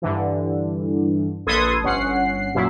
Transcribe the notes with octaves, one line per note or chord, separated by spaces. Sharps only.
G2 D3 E3
A#1 A4 B4 C6 D#6 G#6
G1 C#4 F#5 C7
F#2 A#2 E4